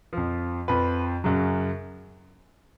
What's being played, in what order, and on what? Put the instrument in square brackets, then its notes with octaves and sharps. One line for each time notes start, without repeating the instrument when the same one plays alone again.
[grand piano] F2 F3
F2 F3 B4
F#2 C#3 F#3